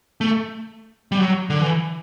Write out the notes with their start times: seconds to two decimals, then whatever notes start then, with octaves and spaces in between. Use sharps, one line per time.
0.21 A3
1.12 G3
1.18 F#3
1.50 D3
1.61 E3